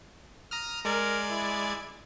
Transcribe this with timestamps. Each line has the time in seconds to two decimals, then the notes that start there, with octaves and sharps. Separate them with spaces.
0.51 A#5 D#6 F6
0.85 G#3 A#4 D5 G#6
1.30 E4